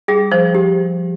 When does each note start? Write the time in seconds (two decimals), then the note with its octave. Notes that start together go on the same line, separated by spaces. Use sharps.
0.08 G3 G#4
0.32 F3 C5
0.54 G4